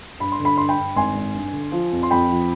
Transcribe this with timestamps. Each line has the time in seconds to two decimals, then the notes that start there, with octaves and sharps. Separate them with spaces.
0.20 G2 B5
0.32 C6
0.40 D3
0.45 B5
0.57 G2 C6
0.69 G5 B5
0.77 G2
0.96 G#1 G#5 C6
1.16 G#1
1.34 G2
1.53 D3
1.72 F3
1.92 F2
2.03 C6
2.11 F2 G5 B5
2.30 F3